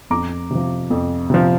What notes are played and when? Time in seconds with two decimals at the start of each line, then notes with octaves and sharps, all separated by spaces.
0.10 F2 A#5 D6
0.51 C3 F3
0.90 F2
1.30 C3 F3